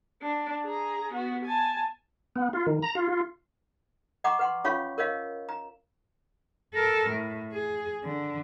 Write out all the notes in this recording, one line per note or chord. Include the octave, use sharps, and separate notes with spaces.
D4
G#4 A#5
B3 F#4
G#5 A5
B3
F4
D#3
A#5
F4
F4
D#5 F#5 A#5 C#6 D6
B4 F#5 C6
C#4 F4 C#5 F5 B5 C#6
A#4 C#5 D#5 F5
A#5
A4 A#4
A2
G#4
D3